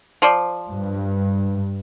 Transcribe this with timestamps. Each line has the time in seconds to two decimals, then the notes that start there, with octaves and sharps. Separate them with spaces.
0.22 F3 C5 D5
0.70 G2